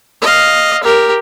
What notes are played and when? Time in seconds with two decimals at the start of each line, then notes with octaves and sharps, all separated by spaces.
0.22 D#5 F5
0.83 G4 A#4